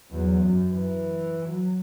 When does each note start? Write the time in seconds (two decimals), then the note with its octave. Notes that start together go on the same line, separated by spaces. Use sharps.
0.11 E2 F#3
0.44 F#2
0.73 E3
1.49 F#3